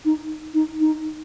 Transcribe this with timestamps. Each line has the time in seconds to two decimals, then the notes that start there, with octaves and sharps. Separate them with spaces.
0.05 D#4
0.54 D#4
0.80 D#4